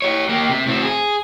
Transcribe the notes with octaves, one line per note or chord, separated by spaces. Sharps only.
G4 C#5
A#3 G4
C3
A2 C4
G#4